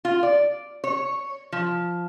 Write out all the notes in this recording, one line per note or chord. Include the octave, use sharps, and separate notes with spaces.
F4
D5
C#5
F3